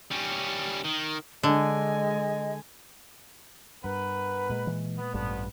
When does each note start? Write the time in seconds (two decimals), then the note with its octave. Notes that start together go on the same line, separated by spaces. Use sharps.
0.11 G3 C#4
0.85 D#3
1.43 D3 G#3 D#5 G#5
3.84 G2 B3 A#4 B4
4.50 A#2 G#3
4.67 E3
4.99 B3
5.14 A1 G2 D3 F3 B3